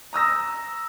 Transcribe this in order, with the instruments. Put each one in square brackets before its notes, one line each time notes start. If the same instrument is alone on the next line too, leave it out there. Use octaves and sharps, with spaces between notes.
[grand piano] A#5 D#6 E6 A#6